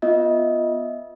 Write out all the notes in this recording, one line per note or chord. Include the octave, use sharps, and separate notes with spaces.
B3 F4 D#5 E5